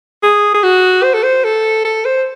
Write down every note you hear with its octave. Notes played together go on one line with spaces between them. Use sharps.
G#4
G#4
F#4
C5
A4
C5
A4
A4
C5